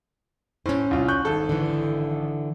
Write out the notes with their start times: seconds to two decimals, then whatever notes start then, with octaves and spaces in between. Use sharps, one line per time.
0.66 A2 C#4 C5
0.91 C2 F4
1.08 C#6 F#6 G6
1.25 G#1 A4
1.49 D3 E3